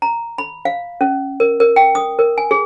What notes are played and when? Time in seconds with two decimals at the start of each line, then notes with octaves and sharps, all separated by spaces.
0.02 A#5
0.38 B5
0.65 F5
1.01 C#4
1.40 A#4
1.60 A#4
1.76 G5
1.95 D#6
2.19 A#4
2.38 G#5
2.51 G#4